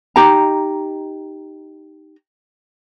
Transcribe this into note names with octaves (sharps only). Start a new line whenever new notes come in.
D#4 G4 A#5